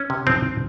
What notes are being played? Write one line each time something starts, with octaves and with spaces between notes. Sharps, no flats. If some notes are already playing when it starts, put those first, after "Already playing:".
Already playing: C#4
C3
F3 C4